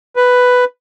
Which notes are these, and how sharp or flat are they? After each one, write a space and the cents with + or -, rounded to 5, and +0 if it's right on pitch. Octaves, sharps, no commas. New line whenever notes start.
B4 +5